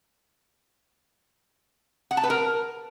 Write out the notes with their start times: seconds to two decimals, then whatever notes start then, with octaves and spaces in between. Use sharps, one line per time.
2.11 F#5
2.17 A5
2.23 B4
2.30 A#4